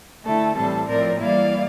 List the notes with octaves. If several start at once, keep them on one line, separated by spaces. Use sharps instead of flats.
D3 A3 E4 A4
A2 E3 G3 C4 A4
A2 F3 C4 A#4 D5
E3 G3 A#3 E4 D5 F5